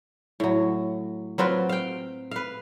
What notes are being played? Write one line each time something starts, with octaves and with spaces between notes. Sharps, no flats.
A2 F#3
F#3 C4 F4 B4
F5 G5
B4 F5